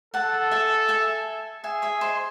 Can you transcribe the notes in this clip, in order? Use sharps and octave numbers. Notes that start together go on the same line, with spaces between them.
A4 F#5 A5
E5 G#5
E5 G#5
G#4 E5 G#5
C#5 E5
C5 D#5